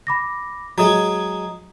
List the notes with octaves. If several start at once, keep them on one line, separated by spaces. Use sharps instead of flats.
B5 D6 A#6
F#3 G#3 A#5 D#6